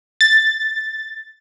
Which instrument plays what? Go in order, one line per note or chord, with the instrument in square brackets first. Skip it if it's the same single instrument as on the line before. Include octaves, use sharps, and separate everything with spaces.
[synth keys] A6